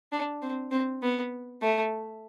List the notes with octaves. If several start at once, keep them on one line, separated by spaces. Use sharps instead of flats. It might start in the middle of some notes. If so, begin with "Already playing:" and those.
D4
C4
C4
B3
A3